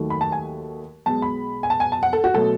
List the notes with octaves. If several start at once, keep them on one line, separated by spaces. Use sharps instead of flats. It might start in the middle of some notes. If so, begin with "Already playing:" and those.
Already playing: D#2 D#3 F#3 A3
B5
A5
G#5
B1 B2 G#3 A5
B5
G#5
A5
G#5
A5
F#5
A4
F#4
B2 F#3 A3 A4